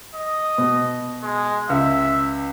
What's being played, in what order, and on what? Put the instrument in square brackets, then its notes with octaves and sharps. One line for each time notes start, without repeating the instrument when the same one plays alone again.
[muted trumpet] D#5
[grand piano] B2
[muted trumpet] G#3
[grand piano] C#2 [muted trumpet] E5